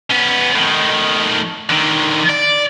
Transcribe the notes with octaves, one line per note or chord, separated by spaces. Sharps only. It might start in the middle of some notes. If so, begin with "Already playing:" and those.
B3 C#4
A2 D#3
D3 D#3
D5